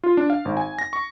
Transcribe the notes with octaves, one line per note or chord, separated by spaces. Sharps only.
F4
D4
F5
G#1
G#5
A#6
C#6